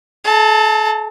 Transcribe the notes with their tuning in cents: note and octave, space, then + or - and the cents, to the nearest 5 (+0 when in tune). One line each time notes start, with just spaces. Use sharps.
A4 -40 A5 +30